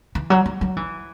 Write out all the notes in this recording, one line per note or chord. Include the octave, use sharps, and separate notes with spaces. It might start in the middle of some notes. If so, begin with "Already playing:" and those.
E3
F#3
F#3
F#3
E3